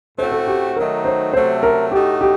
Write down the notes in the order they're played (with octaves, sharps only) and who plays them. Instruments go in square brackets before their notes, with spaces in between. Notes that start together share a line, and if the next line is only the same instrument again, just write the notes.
[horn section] A2 A3 C4 F#4 [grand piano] C5
[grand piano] A4
G4
[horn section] D#3 F#3 A3 D#4 [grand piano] A#4
[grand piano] C5
[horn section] C3 F#3 A3 [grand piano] C5
[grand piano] A#4
[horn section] A2 A3 D#4 F#4 [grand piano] G4
[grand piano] G4